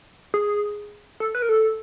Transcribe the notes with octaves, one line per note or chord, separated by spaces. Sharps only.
G#4
A4
B4
A#4
A4